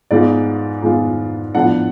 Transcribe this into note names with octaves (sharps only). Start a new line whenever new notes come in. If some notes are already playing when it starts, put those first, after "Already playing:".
G#2 G#3 B3 F4 D5
G#2 G#3 B3 F4
A2 F3 B3 D4 F#5